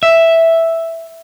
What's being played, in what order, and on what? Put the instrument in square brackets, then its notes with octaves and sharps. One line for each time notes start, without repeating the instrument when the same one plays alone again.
[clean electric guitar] E5